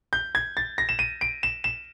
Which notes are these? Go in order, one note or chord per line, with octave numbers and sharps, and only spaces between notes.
G6
G#6
A6
A#6
E7
D#7
D7
E7
E7